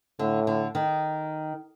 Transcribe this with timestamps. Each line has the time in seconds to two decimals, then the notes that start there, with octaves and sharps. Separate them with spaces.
0.19 A2 D3
0.47 D3
0.75 D#3